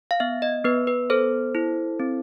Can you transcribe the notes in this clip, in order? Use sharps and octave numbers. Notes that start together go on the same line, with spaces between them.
F5
B3 E5
D#5
B3 B4
B4
A4 C5
E4
C4